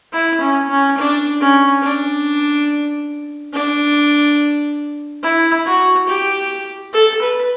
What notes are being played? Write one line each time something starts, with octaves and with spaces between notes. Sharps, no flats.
E4
C#4
C#4
D4
C#4
D4
D4
E4
F#4
G4
A4
B4